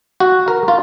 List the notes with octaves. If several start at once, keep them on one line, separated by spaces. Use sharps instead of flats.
F#4
A#4
F4